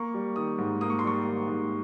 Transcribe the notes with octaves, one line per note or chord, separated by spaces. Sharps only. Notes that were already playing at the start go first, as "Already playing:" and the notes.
Already playing: A#3 C#6
G3
D#3 D#6
G#2
A#3 D#6
C#6
C6
G3 C#6
D#3
G#2